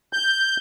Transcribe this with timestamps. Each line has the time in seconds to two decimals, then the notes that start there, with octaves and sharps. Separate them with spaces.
0.13 G6